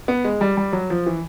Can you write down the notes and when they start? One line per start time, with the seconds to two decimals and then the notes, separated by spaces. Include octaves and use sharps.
0.08 B3
0.24 G#3
0.41 G3
0.57 G3
0.73 F#3
0.90 F3
1.06 E3